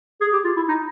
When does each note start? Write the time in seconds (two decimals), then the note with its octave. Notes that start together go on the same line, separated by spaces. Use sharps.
0.21 G#4
0.33 G4
0.44 F4
0.57 E4
0.68 D#4